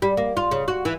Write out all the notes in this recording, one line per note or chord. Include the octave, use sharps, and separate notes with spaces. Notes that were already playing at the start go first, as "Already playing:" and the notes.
G3
A#3
F4
C#3
F#4
E3